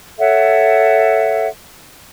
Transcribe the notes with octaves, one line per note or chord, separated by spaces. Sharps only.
A4 C#5 E5 F#5